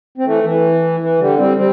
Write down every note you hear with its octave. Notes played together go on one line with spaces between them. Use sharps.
C4
E3 A3
E3
E3
D3 G3
G3 C4
G3 C4